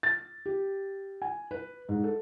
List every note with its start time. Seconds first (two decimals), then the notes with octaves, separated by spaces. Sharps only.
0.03 A6
0.46 G4
1.22 G#5
1.51 B4
1.89 G#2
2.04 A4